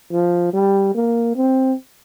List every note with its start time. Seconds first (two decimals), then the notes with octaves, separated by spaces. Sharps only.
0.12 F3
0.53 G3
0.95 A#3
1.36 C4